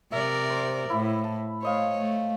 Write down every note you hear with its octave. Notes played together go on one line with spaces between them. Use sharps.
C3 A#4 D5 E5
C5
A2 E4 B5
A5
A3 C5 C#5 D#5 F5
A3